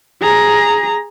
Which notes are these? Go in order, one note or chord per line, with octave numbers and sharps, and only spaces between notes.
G#4 A#5